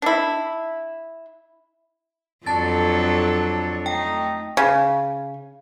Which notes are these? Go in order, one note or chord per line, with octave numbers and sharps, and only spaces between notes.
D4 E4
F2 F#3 D4 A4 C#5 A5 A6
A3 D#4 G5
C#3